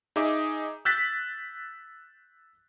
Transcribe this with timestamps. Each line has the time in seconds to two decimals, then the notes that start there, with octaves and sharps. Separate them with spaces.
0.16 D#4 G#4 E5 D6
0.85 E6 F#6 G6 A6 B6